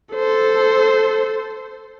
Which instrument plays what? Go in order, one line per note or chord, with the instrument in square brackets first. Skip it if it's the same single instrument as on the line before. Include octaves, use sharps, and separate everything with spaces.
[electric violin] A4 C5